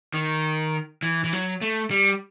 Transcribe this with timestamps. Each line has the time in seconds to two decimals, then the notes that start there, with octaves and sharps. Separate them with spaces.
0.14 D#3
1.03 E3
1.24 E3
1.33 F#3
1.61 A3
1.91 G3